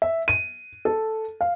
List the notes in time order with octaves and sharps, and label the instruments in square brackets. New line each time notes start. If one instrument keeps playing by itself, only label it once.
[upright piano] E5
D#7
A4
F5